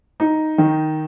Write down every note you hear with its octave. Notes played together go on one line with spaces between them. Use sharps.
D#4
D#3